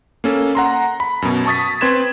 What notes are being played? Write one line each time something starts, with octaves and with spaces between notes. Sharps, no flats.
A#3 C#4 A4
F#5 A#5 C6
B5
F#2 B2
A5 C#6 D#6 A6 B6
C4 B4 C6 G#6 E7